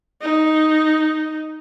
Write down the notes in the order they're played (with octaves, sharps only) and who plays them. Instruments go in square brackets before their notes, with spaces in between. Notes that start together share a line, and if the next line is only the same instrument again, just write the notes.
[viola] D#4